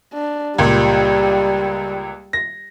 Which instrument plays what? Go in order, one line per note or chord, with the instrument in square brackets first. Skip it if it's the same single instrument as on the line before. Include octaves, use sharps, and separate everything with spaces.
[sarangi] D4
[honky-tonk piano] C#2 A#2 [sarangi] G3
[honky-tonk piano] A#6